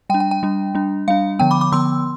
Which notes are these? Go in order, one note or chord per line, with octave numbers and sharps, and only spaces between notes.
G3 D4 G5
G5
G5
G3 D4
G3 D4
G3 D4 F5
D3 F3 B3 G5
B5 D6
B5 D6
D3 F3 B3 C6 E6